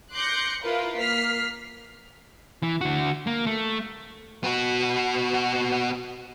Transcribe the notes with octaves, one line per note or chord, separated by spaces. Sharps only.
C6 D6 F#6 G6 A#6 C#7
E4 F4 A#4 B4 F5
A#3 F6 B6 C7
E3
D3 F#4
A#3
A3
B3 F#4